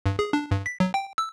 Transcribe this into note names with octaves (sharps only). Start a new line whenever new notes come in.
G2
G#4
D4
G2
B6
F#3
G5
E6